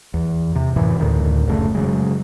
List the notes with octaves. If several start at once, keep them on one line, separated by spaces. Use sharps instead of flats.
E2
C3
F#2 A2 E3
D2 A2 D3 D#3
F1 F#2 C#3 A3
C#3 F#3 G#3